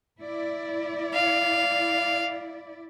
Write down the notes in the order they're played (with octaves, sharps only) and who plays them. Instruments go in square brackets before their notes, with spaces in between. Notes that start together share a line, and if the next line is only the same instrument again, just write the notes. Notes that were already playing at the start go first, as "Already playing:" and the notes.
[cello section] E4 D5
[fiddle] F5